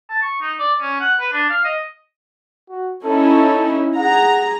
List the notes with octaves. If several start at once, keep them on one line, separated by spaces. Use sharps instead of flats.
A5
C#6
D#4
D5
C#4
F#5
B4
D4
F5
D#5
F#4
C#4 D#4 E4 A4
G#4 F#5 A#5